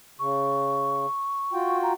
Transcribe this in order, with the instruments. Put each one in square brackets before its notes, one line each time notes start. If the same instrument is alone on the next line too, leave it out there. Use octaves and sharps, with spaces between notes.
[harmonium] C#3 [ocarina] C#6
[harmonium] F4 F#4 G5
[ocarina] A#5